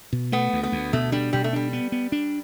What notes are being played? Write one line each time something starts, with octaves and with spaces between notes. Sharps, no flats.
B2
A3 B3
D2
B3
D2
B2 A3
G3 D4
B2 G3
A3
G3 D4
B3
B3
D4